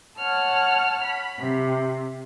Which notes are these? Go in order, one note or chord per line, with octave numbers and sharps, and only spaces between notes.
C#5 F#5 A5 F6
B5
C3